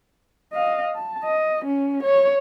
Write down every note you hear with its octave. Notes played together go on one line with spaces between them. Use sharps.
D#5 F5
A5
D#5
C#4
C#5